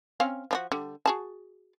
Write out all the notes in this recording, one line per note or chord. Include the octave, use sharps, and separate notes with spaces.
C4 C#4 F5
F3 D4 F#4
D3 G3
F#4 G#4 A5